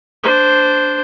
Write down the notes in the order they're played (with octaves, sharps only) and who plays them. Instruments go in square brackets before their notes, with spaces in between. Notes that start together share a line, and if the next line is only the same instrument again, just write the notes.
[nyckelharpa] D4 C5